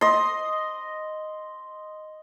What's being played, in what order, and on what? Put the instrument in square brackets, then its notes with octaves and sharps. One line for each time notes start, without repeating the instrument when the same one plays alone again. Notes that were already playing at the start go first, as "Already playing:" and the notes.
[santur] D#5 C6